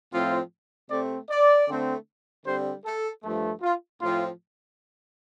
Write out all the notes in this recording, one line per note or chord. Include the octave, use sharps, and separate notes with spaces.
A2 F3 C4 F4
C3 A3 C4 D5
D5
D3 A3 C4
D3 G3 C4 C5
A4
G2 F3 A3
F4
A2 F3 C4 F4